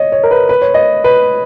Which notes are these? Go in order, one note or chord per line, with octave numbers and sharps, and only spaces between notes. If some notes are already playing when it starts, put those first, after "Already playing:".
Already playing: C#5 D#5
C#5
A#4
B4
B4
C#5
D#5
B4